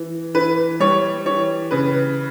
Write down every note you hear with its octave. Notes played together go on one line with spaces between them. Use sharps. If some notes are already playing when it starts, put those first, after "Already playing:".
Already playing: E3
E3 B4
G3 C#5
E3 C#5
C#3 B4